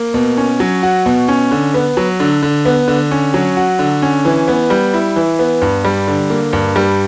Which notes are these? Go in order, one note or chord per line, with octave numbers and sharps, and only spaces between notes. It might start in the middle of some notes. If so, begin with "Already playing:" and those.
Already playing: A#3
B2
C#4
F#3
F#4
B2
C#4
D3
B3
F#3
D3
D3
B3
D3
C#4
F#3
F#4
D3
C#4
E3
B3
G3
E4
E3
B3
G2
G3
D3
A#3
G2
G3